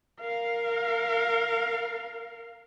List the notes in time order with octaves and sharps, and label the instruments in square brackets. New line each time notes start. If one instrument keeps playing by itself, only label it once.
[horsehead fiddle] A#4 F5